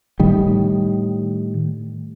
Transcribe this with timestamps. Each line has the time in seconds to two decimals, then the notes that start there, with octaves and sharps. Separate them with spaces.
0.20 A2 D#3 G3